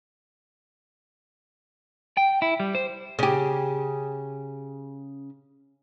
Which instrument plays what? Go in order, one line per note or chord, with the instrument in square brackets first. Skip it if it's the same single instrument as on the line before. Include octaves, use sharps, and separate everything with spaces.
[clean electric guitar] G5
E4
G3
C5
[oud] C#3 G4